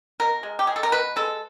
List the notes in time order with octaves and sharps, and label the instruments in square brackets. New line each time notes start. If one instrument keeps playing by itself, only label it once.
[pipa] B2 A#4
G#3
G4
G#3 G#4
A4
A#4
B2 B4
G#3 A4